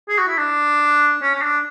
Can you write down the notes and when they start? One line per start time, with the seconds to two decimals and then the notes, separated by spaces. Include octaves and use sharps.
0.09 G#4
0.18 F#4
0.28 E4
0.38 D4
1.22 C#4
1.35 C#4
1.42 D4